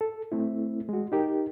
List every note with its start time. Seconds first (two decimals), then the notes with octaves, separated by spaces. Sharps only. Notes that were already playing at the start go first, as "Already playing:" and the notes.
0.01 A4
0.32 A3 C4 E4
0.89 G#3 F#4
1.12 D#4 G4 A#4